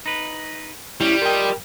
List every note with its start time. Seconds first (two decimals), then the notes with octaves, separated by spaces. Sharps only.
0.06 D#4 B4
1.01 G3 C#4 E4
1.22 F4 A#4 D#5 G5